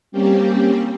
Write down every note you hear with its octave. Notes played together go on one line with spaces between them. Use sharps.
G3 A#3 C4 C#4 G4